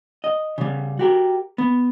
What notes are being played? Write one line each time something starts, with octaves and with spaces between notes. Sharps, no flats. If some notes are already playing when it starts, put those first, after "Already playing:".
D#5
C#3 G3
F#4 G4 A#4
B3